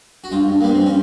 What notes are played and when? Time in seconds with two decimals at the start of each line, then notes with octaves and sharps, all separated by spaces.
0.24 F#4
0.32 G2 F4
0.48 G2
0.61 A#3
0.64 G3 B3
0.75 C4
0.80 G3
0.86 C#4